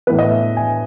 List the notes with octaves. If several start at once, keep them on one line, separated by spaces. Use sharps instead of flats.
A2 E3 B3 B4
D#5
E5
G#5